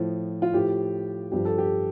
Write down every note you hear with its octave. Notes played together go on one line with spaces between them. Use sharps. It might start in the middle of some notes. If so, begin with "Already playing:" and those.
Already playing: A2 F3
F4
A2 F3 G4
G2 F3 G4
A4
G4